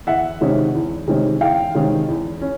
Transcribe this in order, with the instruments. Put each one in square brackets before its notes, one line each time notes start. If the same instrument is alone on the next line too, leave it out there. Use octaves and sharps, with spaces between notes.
[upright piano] E2 E5 F#5
C3 D#3 G#3 C#4
E2
C3 D#3 G#3 C#4
E2 F5 G5
C3 D#3 G#3 C#4
E2
C#4